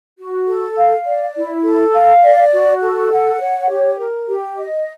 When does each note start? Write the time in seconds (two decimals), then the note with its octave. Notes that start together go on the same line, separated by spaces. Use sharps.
0.18 F#4
0.47 A4
0.77 F5
1.06 D5
1.36 E4
1.64 A4
1.94 F5
2.24 D5
2.53 F#4
2.82 A4
3.11 F#5
3.40 C#5
3.70 G4
3.99 A#4
4.28 G4
4.57 D#5